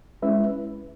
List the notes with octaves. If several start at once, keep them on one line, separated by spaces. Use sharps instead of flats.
G#3 C#4 E4 B4 E5